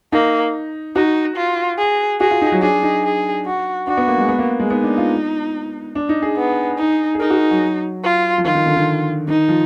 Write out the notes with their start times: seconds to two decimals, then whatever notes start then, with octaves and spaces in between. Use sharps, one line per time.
0.12 A#3 D#4
0.96 D#4 F#4
1.37 F4
1.78 G#4
2.20 F#4 G#4
2.31 F4
2.42 D#4
2.52 F#3
2.62 D4 G#4
2.83 D#4
3.03 G#4
3.46 F#4
3.87 D4 F#4
3.97 B3
4.08 A#3
4.18 G#3
4.29 B3
4.39 A#3
4.60 G#3
4.70 B3 D#4
4.84 D4
4.98 F4
5.95 D4
6.09 D#4
6.22 G#4
6.37 B3
6.78 D#4
7.15 G#4
7.20 D#4 A#4
7.30 F#4
7.51 F#3
8.04 F4
8.38 F3
8.45 D#3 F4
8.55 D#3
8.66 D3
8.76 D#3
9.28 D#3 D#4
9.49 F3